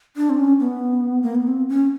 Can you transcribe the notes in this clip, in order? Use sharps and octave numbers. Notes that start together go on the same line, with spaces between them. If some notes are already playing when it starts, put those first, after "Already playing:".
D4
C4
C#4
B3
A#3
B3
C4
C#4